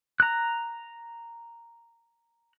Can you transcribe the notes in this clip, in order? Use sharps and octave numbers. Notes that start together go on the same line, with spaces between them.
A#5 F#6